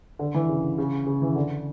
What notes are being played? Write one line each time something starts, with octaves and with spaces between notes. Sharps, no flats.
D3
E3
C#3
C#3
C#3
E3
D3